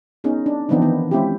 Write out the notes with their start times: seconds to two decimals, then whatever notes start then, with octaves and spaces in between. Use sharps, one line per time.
0.24 B3 C#4 D#4 G#4
0.46 D4
0.69 E3 F3 B3 C4 D4 D#4
0.82 D#3 B3
1.11 G#3 C4 C#4 E4 F4 G4